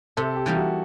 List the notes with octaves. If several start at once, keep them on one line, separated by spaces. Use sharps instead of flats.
C3 A4
G4
E3 G3 A#3 D#4
F#4